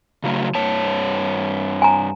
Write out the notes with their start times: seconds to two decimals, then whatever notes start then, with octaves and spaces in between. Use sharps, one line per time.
0.24 C#3 F#3 A3
0.55 G2 C#5 A5
1.82 G#5 A#5